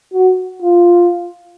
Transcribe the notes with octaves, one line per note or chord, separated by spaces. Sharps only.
F#4
F4